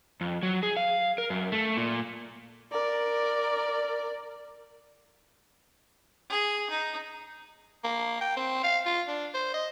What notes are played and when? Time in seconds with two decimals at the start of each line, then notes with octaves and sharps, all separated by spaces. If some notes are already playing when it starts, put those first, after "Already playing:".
0.21 F2
0.43 F#3
0.63 G#4
0.77 F5
1.18 A#4
1.30 F#2
1.52 A3
1.77 A#2
2.72 A#4 D5
6.30 G#4
6.70 D#4
7.84 A#3
8.21 G5
8.37 C4
8.64 F5
8.86 F4
9.08 D4
9.34 C5
9.54 D#5